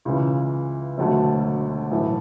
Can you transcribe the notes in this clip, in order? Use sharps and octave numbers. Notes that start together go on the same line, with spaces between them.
C#2 C#3 E3
E1 D2 D3 F#3 A3
B1 A2 E3 A3